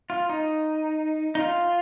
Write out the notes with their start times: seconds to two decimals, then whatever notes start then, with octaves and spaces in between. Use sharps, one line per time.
0.10 F4
0.29 D#4
1.35 D#4
1.39 F4